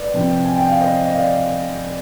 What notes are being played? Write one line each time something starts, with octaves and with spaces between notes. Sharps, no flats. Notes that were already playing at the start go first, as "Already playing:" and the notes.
Already playing: B4 D5
C3 F3 C4
G#5
G5
F5
C5 D#5
D#5
D5 F5